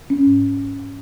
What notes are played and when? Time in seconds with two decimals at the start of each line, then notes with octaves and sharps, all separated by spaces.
0.10 C#4
0.26 G#2